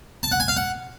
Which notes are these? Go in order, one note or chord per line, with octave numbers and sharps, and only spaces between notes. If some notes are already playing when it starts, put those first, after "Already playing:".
A5
F#5
G#5
F5
F#5